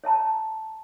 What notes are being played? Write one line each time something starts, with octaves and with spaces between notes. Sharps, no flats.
C#5 E5 A5 A#5